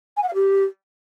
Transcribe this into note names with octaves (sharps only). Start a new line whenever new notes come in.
G#5
F#5
F5
G4